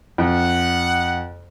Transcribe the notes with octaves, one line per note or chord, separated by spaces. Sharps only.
F2 F#5